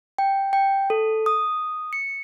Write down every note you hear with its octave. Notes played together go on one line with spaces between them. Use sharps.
G5
G5
A4
D#6
C#7